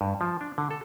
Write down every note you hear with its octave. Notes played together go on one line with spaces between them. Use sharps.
G2
F3
D4
D3
A4